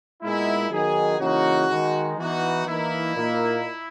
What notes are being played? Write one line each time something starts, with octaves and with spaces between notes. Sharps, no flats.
A#2 G#3 B3 D#4 E4
D#3 F#3 B3 D#4 G#4
C#3 E3 A#3 D#4 F#4
D#3 G#3 D#4
E3 B3 D#4 F#4
E3 A#3 D#4 E4
A#2 A#3 D#4